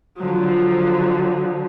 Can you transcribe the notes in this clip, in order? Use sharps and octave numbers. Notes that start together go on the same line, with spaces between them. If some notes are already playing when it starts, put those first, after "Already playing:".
D3 F3 F#3